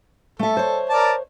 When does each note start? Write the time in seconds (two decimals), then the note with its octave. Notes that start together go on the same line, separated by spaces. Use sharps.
0.39 A3 A4 E5
0.57 C5 C#5
0.90 A#4 D5 A5